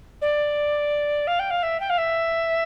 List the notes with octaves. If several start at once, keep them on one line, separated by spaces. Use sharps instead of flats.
D5
F5
G5
F5
E5
G5
F5
E5